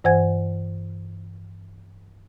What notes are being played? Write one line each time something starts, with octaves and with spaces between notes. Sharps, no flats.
G2 E3 C5 F#5 G#5 G#6